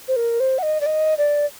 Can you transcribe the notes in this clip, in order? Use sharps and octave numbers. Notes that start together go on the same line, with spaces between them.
C5
A#4
C5
F#5
D#5
D5
D#5
D5